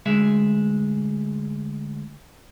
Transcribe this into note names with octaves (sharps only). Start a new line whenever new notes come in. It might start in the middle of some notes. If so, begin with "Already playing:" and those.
D2 G#3 G#4 E5